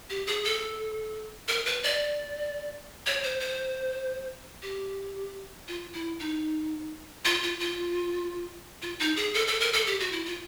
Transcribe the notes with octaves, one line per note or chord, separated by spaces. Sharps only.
G4
G#4
A4
A#4
B4
D5
C#5
C5
C5
G4
F4
E4
D#4
F4
F4
F4
F4
D#4
G#4
A4
A4
A#4
A4
G4
F#4
E4
F4